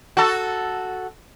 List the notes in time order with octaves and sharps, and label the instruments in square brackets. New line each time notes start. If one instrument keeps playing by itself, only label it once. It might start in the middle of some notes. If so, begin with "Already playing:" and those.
[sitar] F#4 A4